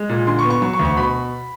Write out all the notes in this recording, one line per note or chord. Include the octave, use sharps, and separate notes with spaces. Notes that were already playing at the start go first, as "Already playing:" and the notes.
Already playing: G#3
A#2
D3 C6
C#6
B3
C#6
F#3 C#6
C#6
D2
C#6
B2 B5